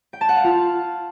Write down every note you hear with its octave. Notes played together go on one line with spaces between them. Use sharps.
G5
A5
F#5
F5
F4